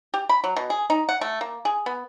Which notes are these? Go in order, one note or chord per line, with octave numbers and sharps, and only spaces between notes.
G4
B5
F#3
B2
G#4
D#4
F#5
A3
A#3
G#4
B3